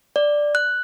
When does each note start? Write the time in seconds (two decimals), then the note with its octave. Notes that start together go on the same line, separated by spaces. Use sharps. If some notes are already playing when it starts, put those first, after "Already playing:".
0.16 D5
0.55 F#6